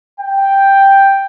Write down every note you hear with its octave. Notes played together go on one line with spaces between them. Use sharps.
G5